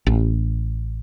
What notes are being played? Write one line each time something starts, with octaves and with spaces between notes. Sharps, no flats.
A1